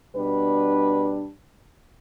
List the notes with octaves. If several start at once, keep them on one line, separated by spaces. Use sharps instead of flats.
B2 G3 D4 B4